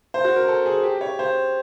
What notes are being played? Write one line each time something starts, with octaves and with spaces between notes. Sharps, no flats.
C5
F#4
A#4
A4
G#4
G4
C#5
C5